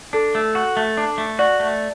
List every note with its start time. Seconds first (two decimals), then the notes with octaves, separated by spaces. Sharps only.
0.13 D4 A4
0.35 A3
0.55 F#4
0.77 A3
0.97 D4
1.18 A3
1.39 F#4 D5
1.60 A3